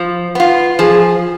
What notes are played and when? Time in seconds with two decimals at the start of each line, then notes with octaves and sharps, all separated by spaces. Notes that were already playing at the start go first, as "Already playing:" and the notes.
Already playing: F3
0.35 B3 F4
0.79 F3 G#4